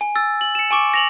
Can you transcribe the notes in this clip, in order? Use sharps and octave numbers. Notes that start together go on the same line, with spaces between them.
G#5
E6 A6
F#7
C#7 E7
G#5 C#6 D6 D7
A#6 F7 F#7